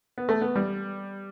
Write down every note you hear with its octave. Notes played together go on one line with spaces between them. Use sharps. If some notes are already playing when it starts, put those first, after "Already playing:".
B3
A3
B3
G3